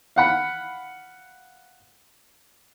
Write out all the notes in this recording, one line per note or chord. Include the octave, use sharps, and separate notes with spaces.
F5 F#5 B5